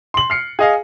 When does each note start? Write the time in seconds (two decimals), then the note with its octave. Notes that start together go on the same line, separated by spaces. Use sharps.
0.14 C6 F#7
0.30 F6 C7 C#7
0.59 G#4 D#5 F5